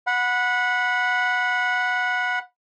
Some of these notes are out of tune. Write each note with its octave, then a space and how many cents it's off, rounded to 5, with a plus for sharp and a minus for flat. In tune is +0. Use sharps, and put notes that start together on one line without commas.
F#5 -15 B5 +0